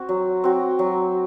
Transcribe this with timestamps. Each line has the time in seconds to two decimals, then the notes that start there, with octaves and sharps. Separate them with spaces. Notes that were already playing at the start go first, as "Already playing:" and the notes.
Already playing: C4 F#4
0.09 F#3
0.44 C4 F#4
0.79 F#3